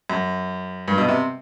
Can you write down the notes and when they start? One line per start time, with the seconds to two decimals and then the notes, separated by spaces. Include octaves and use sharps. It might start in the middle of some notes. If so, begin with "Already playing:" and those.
0.10 F#2
0.88 G2
0.98 B2
1.08 C3